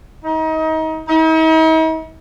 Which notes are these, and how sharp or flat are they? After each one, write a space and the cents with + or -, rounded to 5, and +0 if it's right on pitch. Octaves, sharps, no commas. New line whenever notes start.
D#4 +30
D#4 +45